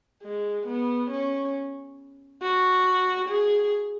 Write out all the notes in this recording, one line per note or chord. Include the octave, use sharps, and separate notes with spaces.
G#3
B3
C#4
F#4
G#4